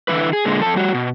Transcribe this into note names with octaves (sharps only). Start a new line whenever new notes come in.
D3 E3 A#3 E4 B4
G#4
A#2 D3 G#3
F2 A4 A5
G3 F#4
B2